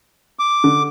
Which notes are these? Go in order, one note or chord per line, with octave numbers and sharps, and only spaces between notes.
D6
D3